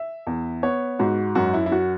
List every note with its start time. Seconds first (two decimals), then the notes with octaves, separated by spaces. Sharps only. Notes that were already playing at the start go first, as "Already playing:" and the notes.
Already playing: E5
0.27 E2
0.63 B3 C#5
0.99 G#2 F#4
1.35 F#2 F#4
1.54 E4
1.66 E4
1.71 F#3 F#4